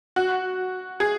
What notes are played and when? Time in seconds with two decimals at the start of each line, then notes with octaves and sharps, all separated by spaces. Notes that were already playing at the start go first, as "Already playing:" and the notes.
0.16 F#4
1.00 G#4